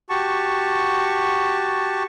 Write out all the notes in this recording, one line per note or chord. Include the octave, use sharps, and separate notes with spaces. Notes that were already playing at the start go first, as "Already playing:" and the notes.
F#4 G4 A5 C#6